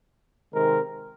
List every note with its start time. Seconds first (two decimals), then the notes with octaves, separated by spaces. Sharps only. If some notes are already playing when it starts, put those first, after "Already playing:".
0.52 C3 D#3 G#3 C4 A#4